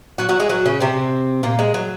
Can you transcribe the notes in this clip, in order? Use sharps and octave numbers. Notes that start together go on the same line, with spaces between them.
F#3 F#4
F#3 F#4
G#3 G#4
F#3 F#4
C#3 C#4
C3 C4
A#2 A#3
G#3
F#3